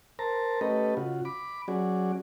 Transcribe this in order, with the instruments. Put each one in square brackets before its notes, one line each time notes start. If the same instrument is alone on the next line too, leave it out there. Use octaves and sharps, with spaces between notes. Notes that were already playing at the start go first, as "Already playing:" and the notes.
[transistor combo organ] A#4 C5 A5 A#5
A3 C#4 G4 A4 B4 D#5
C#3 F4 F#4
B5 D6
F#3 C#4 F#4 G#4 D5